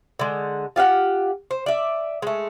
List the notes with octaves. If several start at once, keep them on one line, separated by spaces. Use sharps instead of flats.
D3 G#3
F4 G4 F5 F#5
C5
D5 E5
G#3 A3